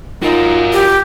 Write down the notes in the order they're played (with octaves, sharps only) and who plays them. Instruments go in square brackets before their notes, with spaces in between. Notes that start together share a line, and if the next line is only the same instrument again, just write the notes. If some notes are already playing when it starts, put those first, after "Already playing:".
[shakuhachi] D#4 [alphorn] F4 [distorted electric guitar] F#4 A#4
[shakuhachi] G4